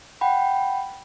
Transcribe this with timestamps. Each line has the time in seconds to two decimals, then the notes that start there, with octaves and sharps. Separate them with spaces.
0.21 F#5 G5 B5